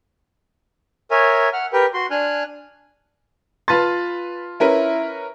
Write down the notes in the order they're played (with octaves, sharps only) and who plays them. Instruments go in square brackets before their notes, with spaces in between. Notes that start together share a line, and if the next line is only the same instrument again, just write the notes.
[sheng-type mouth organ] A#4 C#5 E5 G#5
F#5 F6
G4 A#4 B4 G5
F#4 C6
D4 G#5 F6 F#6
[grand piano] F4 A5 C6 [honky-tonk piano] B4 A6
[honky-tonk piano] C#4 A#4 B4 [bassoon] E4